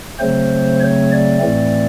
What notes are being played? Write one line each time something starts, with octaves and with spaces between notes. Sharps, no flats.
C#3 F#3 A3 C4 C5
C#5
D5
A2 E3 A3 C4